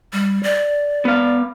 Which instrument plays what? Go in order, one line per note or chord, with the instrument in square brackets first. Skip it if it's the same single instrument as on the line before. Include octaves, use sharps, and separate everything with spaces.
[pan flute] G3
D5
[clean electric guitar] B3 F5